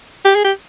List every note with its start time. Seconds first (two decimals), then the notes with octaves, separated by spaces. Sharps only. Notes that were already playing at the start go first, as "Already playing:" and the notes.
0.25 G4
0.35 G#4
0.44 G4